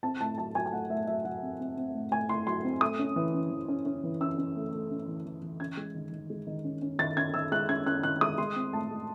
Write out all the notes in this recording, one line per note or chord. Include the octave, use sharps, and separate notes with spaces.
C4 A5
A2 A5
F#3 A5
F#3 G#5
G#5
A3 F#5
A2 E5
F#3 E5
F#3 F#5
C4
C4
C4
A2
A2 G#5
A2 C6
F#3 C6
C4
A3 D#6
C#4
E3
C#4
E3
C#4
C#4
E3
C#4 E6
C#4
A3
A3
C#4
E3
E3
E3
C#4 G#6
G#3
D#3
D#3
G#3
D#3
C#4
C#4
D#3 A6
C#4 G#6
D#3 E6
G#3 F#6
C#4 G#6
C#4 F#6
D#3 F#6
G#3 D#6
G#3 C6
C4
A2 A5
G#3